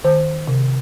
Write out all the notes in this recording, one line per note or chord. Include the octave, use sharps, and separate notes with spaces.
D#3 C5
C3